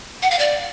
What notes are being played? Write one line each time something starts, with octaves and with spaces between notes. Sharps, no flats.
F#5
F5
D5